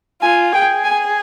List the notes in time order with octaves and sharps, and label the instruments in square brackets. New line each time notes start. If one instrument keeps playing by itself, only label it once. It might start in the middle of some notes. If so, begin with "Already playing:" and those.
[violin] F4 [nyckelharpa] G#5
[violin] G#4 [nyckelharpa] G5
[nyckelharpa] G#5